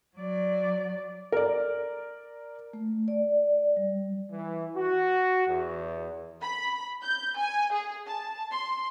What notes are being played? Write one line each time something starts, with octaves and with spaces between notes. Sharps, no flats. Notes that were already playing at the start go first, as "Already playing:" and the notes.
F#3 D5
A#4 D5
A3
D5
G3
E3
F#4
E2
B5
G6
G#5
G#4
A5
C6